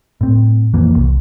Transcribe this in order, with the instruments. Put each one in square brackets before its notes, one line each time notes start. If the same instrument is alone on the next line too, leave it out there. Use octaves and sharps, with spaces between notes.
[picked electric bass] A2 C4
D#1 F2 E3 A#3
C2